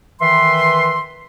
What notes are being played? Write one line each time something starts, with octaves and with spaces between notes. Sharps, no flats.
D#3 E3 B4 E5 C6